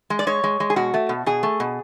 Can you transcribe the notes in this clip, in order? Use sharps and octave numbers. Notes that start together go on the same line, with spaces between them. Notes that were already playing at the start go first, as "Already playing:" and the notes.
G#3
D5
G#3 C#5
G#3
G#3
G#4
B2 F#4
A3
B2
B2 G#4
A3
B2